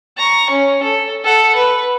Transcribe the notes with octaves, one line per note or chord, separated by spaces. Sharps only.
A#5 C#6
C#4
A4
A4 F#5
B4